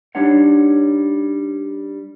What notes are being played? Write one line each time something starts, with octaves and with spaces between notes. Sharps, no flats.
G3 D4 D#4 C#5 F#5